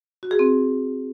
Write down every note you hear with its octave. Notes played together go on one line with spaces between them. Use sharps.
F#4
G#4
C4